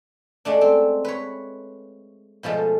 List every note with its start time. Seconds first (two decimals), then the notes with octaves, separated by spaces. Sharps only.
0.45 G#3 A3 D4
0.61 C4
1.05 B4 C#5
2.43 B2 F3 G#3 A3